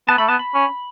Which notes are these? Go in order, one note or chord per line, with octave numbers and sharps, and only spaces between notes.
B3 A5
A3 B5
B3 A5
B5
C#4